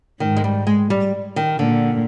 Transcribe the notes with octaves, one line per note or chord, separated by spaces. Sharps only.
G#2 D#3
G#3
G3
G#3
G3
D#3
A#2 D3